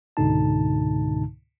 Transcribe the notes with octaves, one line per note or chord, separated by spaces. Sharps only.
C#2 G#2 B2 D3 D#4 A5